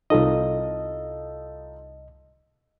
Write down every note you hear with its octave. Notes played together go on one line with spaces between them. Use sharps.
C2 D#4 F4 A4 D#5